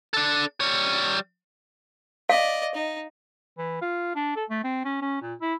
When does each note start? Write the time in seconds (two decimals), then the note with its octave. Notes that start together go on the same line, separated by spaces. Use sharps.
0.14 D4 A4
0.61 G3 C#5
2.29 D5 D#5 F5
2.75 D#4
3.58 E3
3.81 F4
4.16 D4
4.36 A4
4.50 A3
4.64 C4
4.85 C#4
5.02 C#4
5.22 A#2
5.41 E4